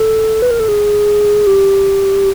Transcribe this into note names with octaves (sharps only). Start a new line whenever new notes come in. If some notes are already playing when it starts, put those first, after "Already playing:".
Already playing: A4
B4
A#4
A4
G#4
G4